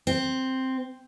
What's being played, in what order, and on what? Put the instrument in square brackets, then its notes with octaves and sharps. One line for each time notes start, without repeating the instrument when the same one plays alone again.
[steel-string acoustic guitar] C4